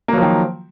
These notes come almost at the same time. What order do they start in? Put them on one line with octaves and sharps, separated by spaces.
A#3 F#3 F3 D#3